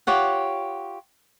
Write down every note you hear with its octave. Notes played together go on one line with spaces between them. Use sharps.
F4 G4 C#5 F#5